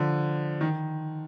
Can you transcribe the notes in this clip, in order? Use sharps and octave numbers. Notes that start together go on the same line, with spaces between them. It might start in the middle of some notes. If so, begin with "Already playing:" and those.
Already playing: D3 F3
D#3